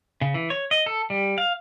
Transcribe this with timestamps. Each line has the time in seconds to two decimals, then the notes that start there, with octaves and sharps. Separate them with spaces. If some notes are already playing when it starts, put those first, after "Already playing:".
0.21 C#3
0.34 E3
0.50 C#5
0.71 D#5
0.86 A4
1.10 G3
1.38 F5